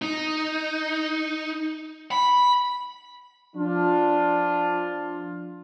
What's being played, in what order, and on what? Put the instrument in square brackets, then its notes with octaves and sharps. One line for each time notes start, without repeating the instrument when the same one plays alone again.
[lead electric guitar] D#4
B5
[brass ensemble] F3 D4 F4